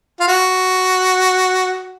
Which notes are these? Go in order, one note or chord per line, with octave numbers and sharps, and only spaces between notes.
F4
F#4